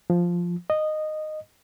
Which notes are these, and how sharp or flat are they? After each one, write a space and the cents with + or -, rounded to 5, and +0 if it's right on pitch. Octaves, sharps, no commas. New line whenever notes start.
F3 +0
D#5 -15